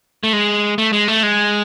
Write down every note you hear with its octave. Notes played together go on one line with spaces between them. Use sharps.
A3
G#3
A3
G#3
A3
G#3